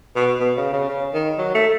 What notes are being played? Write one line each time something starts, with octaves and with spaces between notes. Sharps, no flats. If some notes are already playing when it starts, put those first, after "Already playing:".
B2
B2
C#3
C#3
C#3
D#3
F#3
A3